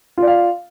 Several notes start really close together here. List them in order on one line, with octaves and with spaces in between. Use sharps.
F4 D5 F5